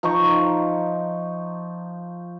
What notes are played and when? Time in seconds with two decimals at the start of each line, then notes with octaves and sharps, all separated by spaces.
0.03 F3 D#4 A#5 C#6